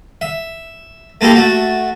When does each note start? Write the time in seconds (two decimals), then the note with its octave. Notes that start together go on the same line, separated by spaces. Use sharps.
0.21 E5
1.21 A3 A#3 E4 G4 A4
1.35 A3 F#4